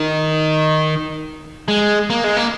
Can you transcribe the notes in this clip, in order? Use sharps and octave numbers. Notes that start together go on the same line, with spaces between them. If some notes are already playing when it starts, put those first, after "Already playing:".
Already playing: D#3
G#3
A#3
G#3
A#3